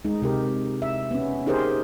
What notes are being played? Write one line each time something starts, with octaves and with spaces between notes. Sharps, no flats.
G#3 D#4
C3 G4 A#4
E5
B3 C#4
D#4 G4 G#4 A#4 C5